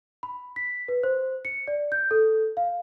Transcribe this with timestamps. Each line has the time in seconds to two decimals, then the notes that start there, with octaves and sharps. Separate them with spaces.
0.23 B5
0.56 B6
0.88 B4
1.03 C5
1.45 C#7
1.67 D5
1.92 G6
2.11 A4
2.57 F5